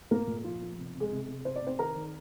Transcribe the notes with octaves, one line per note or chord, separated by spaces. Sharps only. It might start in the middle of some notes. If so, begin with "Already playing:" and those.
A#2 A#3 A#4
A#2
F3 F4
F3
C3
C3
G#3 G#4
C3
C3
C3 C5
D5
C3 C4 C5
D#3 A#4 A#5
D#3